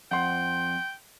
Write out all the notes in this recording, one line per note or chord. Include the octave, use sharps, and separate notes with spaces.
F2 F#5 G5 C6